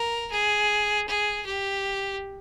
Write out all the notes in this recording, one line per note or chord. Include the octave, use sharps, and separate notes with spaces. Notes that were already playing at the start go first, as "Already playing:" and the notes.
Already playing: A#4
G#4
G#4
G4